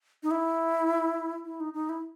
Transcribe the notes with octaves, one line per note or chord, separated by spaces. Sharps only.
D#4
E4
E4
D#4
D#4
E4